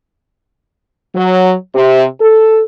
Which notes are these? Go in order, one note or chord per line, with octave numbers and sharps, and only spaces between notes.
F#3
C3
A4